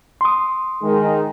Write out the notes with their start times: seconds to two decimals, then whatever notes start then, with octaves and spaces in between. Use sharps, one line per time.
0.21 C6 D#6
0.82 D#3 G#3